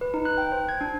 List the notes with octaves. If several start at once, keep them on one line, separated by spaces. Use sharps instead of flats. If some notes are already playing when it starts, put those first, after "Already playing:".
B4
D#4
F#6
G5
C5
G#6
D4